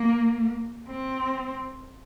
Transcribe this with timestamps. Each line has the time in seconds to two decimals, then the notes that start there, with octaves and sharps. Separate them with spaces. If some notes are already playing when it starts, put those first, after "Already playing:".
Already playing: A#3
0.89 C4